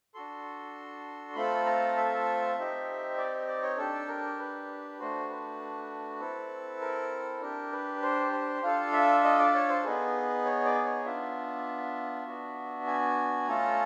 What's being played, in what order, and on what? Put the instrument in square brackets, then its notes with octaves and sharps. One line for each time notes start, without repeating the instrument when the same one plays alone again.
[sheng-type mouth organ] D4 F#4 A4 C6
A3 C4 F4 A4 B5
A#5
E5
C4 D#4 G4
D5
D5
C#5
D4 G4 A4
A#4
B4
A3 D4 F#4 C5
B4
C4 E4 A4
A#4
D4 G4 A#4
B4
C5
C5
D4 F4 A4 F5
E5
D#5
D5
C#5
C5
B3 D#4 G#4 B4
C#5
D5
C#5
B3 D4 F4 E5
B3 D4 F#4
G#5
A3 C#4 F4 A4 A#5